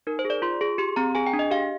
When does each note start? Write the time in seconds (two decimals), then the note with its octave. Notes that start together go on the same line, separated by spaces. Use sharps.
0.07 D#4 A#4
0.19 C5
0.25 G#4
0.30 D5
0.42 F4 C6
0.61 G#4
0.78 G4 C6
0.96 C4 A#5
1.15 G#4 G#5
1.26 G5
1.33 D4
1.39 D#5
1.51 G4 F5